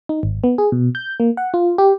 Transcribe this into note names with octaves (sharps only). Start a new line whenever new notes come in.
D#4
G#1
B3
G#4
B2
G6
A#3
F#5
F4
G4